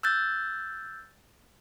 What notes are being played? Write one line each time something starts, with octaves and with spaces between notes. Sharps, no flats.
E6 F#6 G6 A6